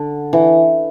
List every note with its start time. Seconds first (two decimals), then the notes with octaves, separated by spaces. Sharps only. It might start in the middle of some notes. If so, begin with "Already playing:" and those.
Already playing: D3
0.33 E3